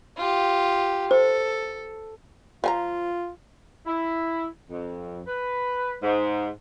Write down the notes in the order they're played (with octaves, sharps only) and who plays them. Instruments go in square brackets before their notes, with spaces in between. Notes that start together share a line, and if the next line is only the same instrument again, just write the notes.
[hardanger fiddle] F4 G4
[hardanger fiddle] A4 [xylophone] C5
[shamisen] F3 G#5 A#5 [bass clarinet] F4
[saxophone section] E4
F2
B4
G#2